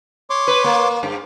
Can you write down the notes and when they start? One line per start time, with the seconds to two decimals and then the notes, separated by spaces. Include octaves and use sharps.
0.30 C#5 C6 D6
0.47 B4
0.64 A#3
1.03 G2